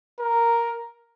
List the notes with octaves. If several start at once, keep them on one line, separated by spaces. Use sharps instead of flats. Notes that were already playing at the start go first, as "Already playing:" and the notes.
A#4